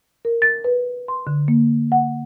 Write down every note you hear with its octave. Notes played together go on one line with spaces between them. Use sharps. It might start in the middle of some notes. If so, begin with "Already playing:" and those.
A#4
A6
B4
C6
D3
A#3
F#5